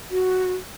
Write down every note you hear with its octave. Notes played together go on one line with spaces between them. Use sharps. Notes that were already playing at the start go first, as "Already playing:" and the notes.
F#4